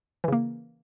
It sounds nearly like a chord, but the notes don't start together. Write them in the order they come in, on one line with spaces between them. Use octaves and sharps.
E3 C#3 A#3